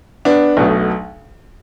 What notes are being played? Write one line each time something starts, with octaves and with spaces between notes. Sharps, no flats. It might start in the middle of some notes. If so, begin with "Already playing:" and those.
B3 D4
B1 B2 A3